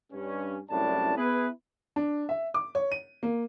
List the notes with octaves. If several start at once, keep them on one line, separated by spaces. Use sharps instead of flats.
G2 C#4
C2 F#2 A2 D4 A5
B3 E4 G#4 B4
D4
E5
D6
C#5
D#7
A#3